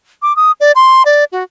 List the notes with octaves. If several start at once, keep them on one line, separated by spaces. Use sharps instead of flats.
D6
D#6
D5
C6
D5
F#4